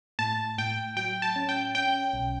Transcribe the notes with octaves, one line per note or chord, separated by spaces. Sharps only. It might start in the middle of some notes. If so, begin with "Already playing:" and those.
A2 A5
A2 G5
F#3 G5
A5
C#4
G5
C#4 G5
B1